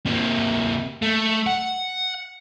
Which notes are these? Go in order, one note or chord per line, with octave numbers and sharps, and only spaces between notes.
C3 A#3
A3
F#5